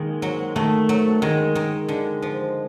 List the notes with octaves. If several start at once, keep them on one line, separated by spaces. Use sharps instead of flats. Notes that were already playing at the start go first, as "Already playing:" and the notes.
Already playing: D#3 G#3 A#3
F#3
D#3 A3
F#3
D#3 G#3
D#3
D3
F3